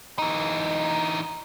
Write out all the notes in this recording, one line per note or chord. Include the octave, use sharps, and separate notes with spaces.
E3 D#4